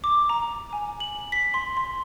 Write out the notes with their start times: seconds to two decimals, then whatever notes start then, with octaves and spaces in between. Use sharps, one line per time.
0.04 D6
0.29 A#5
0.73 G#5
1.00 F#7
1.32 B6
1.54 C6
1.77 C6